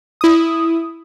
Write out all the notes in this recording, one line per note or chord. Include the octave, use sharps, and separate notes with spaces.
E4 D#6